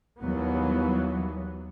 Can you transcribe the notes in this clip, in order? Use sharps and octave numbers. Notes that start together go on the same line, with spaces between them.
D#2 E3 F#3 G3 B3